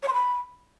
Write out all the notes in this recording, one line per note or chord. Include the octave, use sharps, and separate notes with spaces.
C#5
C6
B5